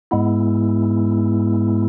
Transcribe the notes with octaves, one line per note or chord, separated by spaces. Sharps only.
G#2 G#3 B3 E4